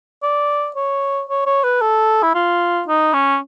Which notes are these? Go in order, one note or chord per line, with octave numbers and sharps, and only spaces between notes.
D5
C#5
C#5
C#5
B4
A4
E4
F4
D#4
C#4